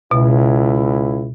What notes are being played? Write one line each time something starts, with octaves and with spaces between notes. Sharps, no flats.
C#2 B2 E4